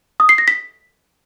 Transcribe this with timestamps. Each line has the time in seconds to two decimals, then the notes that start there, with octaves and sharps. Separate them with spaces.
0.20 D#6
0.29 C7
0.38 A#6
0.48 B6